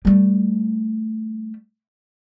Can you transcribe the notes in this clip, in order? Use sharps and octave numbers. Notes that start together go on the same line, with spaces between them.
G3 A3